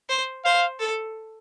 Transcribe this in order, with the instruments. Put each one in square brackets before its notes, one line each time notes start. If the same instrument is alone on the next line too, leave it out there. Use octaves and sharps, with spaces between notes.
[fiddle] C5
[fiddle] C5 [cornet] F5
[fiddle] A4